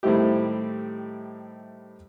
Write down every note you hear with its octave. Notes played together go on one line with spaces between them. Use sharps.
A2 D#3 G3 C4 E4 G4